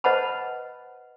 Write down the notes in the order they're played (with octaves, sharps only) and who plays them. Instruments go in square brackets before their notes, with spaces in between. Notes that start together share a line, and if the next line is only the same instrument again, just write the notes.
[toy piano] B4 C5 D#5 F#5 A5 B5